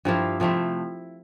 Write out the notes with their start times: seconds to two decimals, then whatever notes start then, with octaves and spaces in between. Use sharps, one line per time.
0.05 G2 F3 A#3 E4
0.40 C3 F3 A3 E4